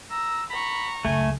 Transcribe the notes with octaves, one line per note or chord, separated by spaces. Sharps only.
A#5 E6
A#5 B5 C#6
C#2 F#2 A3 G#5